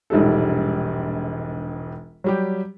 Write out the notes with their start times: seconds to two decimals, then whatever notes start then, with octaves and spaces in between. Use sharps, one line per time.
0.10 E1 A#1 G#2 G3 A4
2.24 F#3 G3 G4